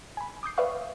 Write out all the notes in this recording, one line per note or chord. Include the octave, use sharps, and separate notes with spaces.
G#5 B5
D6 D#6 G6 C7
B4 D5 E5 F5 C#6 F#6